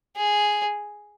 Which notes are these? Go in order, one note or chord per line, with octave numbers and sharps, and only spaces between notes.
G#4